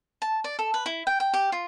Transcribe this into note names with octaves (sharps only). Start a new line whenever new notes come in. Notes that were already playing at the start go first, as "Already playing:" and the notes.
A5
D5
A4
B4
E4
G5
G5
G4
F4